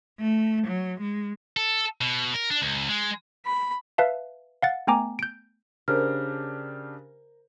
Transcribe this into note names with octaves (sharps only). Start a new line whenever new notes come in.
A3
F#3
G#3
A4
B2
A#4
D4
C#2
G#3
B5
B4 E5 F5 A5
F5 F#5 A6
A3 B3 G5 G#5 A#5 D6
G6 D7
C#3 D4 G4 A#4 C5 F6